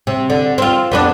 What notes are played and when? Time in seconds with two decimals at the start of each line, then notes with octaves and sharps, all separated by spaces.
0.07 C3
0.30 D3
0.58 C4 F4
0.92 F2 B3 D4